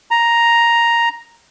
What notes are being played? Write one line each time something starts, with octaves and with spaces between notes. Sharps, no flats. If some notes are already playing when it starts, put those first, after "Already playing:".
A#5